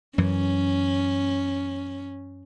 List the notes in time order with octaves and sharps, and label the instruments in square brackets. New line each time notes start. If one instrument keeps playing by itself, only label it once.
[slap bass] F#2 E3 [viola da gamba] C#4